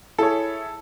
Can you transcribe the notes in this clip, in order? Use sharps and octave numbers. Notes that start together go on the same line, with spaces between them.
E4 G#4 A4 C#5